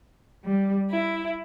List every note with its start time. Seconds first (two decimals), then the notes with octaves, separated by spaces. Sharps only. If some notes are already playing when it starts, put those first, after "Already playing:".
0.44 G3
0.91 E4